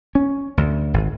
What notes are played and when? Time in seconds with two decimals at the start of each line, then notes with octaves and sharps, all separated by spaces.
0.15 C#4
0.57 D2
0.94 G#1